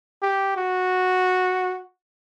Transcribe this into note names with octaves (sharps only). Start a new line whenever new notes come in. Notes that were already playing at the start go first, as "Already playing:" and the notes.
G4
F#4